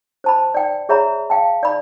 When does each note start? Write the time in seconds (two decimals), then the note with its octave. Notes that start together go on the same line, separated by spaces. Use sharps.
0.24 C5 A5 B5
0.54 D5 G5
0.89 G#4 C#5 E5 A#5 B5
1.30 F5 G5 A5
1.63 D5 B5